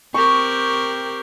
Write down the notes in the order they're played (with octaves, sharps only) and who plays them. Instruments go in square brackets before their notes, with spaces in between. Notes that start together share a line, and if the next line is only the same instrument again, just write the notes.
[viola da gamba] C4 G4 A#4 [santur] C#6